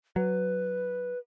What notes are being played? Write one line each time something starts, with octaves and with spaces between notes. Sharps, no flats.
F#3 B4